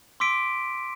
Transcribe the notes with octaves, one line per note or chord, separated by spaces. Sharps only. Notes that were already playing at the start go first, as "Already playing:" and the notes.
C6 D6 E6 B6 D7